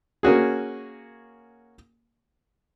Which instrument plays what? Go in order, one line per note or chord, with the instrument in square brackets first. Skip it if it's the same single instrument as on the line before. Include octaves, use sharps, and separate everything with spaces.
[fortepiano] A#3 C#4 F#4 G#4